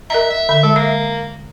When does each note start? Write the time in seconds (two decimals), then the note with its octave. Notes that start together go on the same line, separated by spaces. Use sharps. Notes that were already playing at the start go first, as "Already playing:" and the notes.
0.10 A#4 D#5 E5 A#5
0.30 E5
0.49 D3 E5
0.63 G#3 A4
0.76 A#3 E5